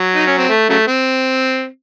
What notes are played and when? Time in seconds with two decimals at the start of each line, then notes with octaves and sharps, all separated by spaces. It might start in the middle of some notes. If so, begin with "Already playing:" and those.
Already playing: F#3
0.15 D#4
0.27 C#4
0.38 C4
0.49 A3
0.69 C#3 F#3 A3
0.87 C4